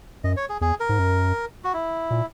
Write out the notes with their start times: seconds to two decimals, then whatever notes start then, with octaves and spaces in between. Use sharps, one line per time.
0.24 F#2 D#5
0.37 C#5
0.49 G#4
0.61 E2 G#4
0.80 A#4
0.89 G#2
0.99 F#2
1.64 F#4
1.73 E4
2.11 A#2